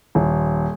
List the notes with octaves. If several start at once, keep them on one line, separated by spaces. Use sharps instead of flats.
D#1